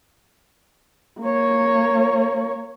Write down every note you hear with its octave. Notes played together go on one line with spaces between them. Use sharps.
A#3 C#5